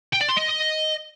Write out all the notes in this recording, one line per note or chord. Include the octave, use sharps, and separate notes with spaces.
G5
D5
C6
D#5